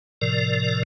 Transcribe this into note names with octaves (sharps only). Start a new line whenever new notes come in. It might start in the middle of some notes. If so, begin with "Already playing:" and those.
A2 C3 F3 A#4 D5